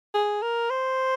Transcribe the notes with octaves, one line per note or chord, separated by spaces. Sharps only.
G#4
A#4
C5